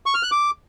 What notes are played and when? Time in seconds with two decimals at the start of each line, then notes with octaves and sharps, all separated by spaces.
0.06 C#6
0.14 F6
0.23 F#6
0.31 D6